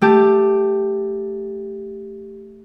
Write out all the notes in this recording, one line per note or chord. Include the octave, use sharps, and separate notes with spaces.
A3 G4 A5